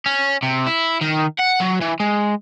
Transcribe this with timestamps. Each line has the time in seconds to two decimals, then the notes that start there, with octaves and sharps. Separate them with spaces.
0.06 C#4
0.42 C3
0.66 E4
1.01 D#3
1.39 F#5
1.60 F#3
1.81 E3
2.00 G#3